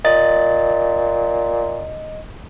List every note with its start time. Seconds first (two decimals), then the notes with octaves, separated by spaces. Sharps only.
0.05 A#2 D#5 A6